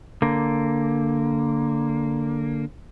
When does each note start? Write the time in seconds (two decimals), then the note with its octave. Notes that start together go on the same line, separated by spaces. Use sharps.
0.22 D3 A#3